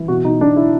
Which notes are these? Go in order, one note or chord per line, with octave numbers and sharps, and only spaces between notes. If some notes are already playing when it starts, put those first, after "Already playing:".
Already playing: E3
B2 F#4
B2 D#4
B2 D4
E4